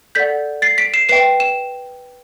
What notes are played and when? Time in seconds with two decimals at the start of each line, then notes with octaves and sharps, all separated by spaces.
0.15 A4 D5 F#5 G6 B6
0.62 A6 C7
0.78 B6 D7
0.94 C7 E7
1.09 B4 E5 G5 C7 E7
1.40 E7